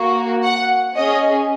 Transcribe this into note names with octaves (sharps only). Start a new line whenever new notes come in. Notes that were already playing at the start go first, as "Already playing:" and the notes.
Already playing: A#3 F#4
F#5
C#4 G#4 D#5